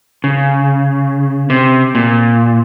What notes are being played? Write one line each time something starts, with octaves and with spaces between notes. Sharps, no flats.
C#3
C3
A#2